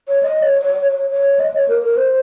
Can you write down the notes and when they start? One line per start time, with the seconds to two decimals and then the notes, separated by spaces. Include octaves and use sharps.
0.08 C#5
0.23 D#5
0.42 C#5
0.62 C#5
0.81 C#5
1.11 C#5
1.39 D#5
1.54 C#5
1.68 A#4
1.83 A#4
1.97 C5